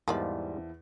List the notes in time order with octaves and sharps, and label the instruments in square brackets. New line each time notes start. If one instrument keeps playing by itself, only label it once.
[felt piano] E2 E4 [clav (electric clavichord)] G#2 G3 [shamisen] F3 A#3 D5